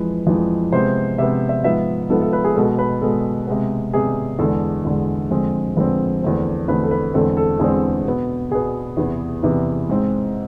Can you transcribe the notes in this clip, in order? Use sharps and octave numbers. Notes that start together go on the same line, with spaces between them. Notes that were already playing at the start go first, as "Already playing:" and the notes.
Already playing: F2 E3 G#3 B4
F2 E3 G#3
C3 G#3 B3 C5
C3 G#3 B3 E5
E5
G#2 F3 B3 E5
G#2 F3 B3 A4
A4
B4
G#4
B2 G#3 B3 A4
B4
B2 G#3 B3 A4
C3 G#3 B3
C3 G#3 B3 G#4
E2 D3 G#3 A4
E2 D3 G#3
F2 D3 G#3 C4
F2 D3 G#3 C4 B4
E2 D3 A3 C4
E2 D3 A3 C4 B4
A4
B4
E2 D3 G#3 C4 A4
A4
E2 D3 G#3 C4 G#4
B2 B3
B2 B3 G#4
E2 C3 E3 B3
E2 C3 E3 B3
G#2 G#3 C4